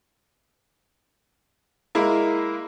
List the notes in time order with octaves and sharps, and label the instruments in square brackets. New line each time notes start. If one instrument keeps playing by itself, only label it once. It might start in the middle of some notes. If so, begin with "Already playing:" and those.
[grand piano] G#3 A#3 E4 A#4